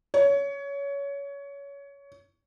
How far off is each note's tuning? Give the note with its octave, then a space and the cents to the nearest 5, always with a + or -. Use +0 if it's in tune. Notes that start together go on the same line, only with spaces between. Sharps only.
C#5 +20